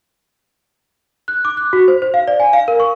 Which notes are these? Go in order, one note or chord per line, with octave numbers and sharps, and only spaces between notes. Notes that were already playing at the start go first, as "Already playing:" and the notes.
F#6
D6
F#6
F#4
C5
C5
F5
D5
G#5
F5
A#4
C#6